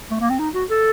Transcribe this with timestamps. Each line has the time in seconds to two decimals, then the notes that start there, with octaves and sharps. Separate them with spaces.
0.11 A3
0.20 A#3
0.30 C4
0.39 D#4
0.54 F#4
0.69 A4